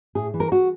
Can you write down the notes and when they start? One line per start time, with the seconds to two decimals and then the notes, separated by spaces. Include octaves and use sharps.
0.15 A2 G#4
0.34 E3
0.40 A#4
0.52 F#4